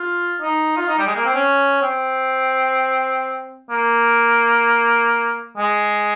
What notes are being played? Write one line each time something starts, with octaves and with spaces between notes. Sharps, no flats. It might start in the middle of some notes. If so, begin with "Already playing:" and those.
Already playing: F4
D#4
F4
D#4
G3
G#3
A#3
C4
C#4
C4
A#3
G#3